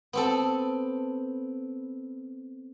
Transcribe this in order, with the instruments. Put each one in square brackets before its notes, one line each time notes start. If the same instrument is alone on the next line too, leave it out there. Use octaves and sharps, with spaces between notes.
[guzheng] B3 C4 A4